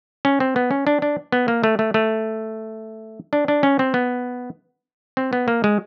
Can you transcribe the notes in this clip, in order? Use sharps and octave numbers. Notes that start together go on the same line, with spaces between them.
C#4
C4
B3
C#4
D4
D4
B3
A#3
A3
A3
A3
D4
D4
C#4
C4
B3
C4
B3
A#3
G#3